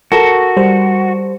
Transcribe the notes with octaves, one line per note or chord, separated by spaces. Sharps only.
F#4 A4 A#4
G3 C5